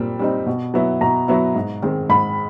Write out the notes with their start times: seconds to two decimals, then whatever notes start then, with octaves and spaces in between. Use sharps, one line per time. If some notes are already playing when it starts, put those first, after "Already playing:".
Already playing: A#2 G3 C4
0.19 G3 C4 D#4
0.46 B2
0.74 F#3 B3 E4
1.01 B2 A#5
1.28 F#3 B3 E4
1.55 G#2
1.82 D#3 G#3 C4
2.09 G#2 B5